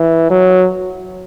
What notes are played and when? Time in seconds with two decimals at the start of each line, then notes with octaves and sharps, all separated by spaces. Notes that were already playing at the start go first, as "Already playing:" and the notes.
Already playing: E3
0.31 F#3